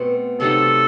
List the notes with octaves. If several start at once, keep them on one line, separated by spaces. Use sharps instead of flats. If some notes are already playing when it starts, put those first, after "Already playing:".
Already playing: B2 A3 C4
C3 F#3 A3 D#4 A4